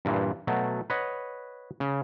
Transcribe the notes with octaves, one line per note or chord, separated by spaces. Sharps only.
G2 A#2 E3
B2 F#3 A3
B4 C#5 D#5 F#5
C#3